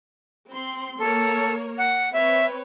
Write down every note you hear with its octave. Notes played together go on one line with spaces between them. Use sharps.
C4 C6
A#3 A4 A#4 C#5
F#5
C4 B4 C#5 E5